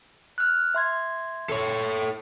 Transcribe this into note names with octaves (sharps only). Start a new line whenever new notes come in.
F6 F#6
E5 C6 G#6
A4 C#5